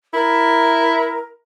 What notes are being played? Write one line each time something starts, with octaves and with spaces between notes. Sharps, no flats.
E4 A#4